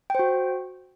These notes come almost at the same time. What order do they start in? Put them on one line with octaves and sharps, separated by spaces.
G5 C5 F#4